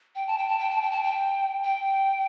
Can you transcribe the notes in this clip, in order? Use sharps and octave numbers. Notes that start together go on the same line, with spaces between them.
G5
A5
G5
A5
G5
A5
G5
A5
G5
G5